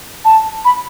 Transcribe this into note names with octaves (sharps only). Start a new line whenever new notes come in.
A5
B5